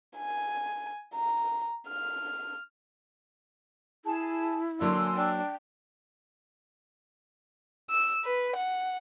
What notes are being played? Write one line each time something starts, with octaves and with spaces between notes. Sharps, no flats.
G#5
A#5
F6
E4 G#4 A5
D3 F#3 A#3 G#5 C6 E6
D4 G5
E6
B4
F#5